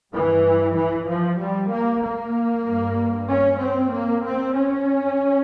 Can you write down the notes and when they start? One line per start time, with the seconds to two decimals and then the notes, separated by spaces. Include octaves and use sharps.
0.13 G2 E3
0.76 E3
1.08 F3
1.40 G3
1.71 A#3
2.03 A#3
2.66 G2
3.29 C#4
3.60 C4
3.92 A#3
4.24 C4
4.55 C#4